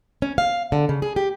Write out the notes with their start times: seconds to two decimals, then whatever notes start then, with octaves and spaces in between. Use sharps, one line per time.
0.22 C#4
0.38 F5
0.72 D3
0.89 C#3
1.02 G#4
1.16 G4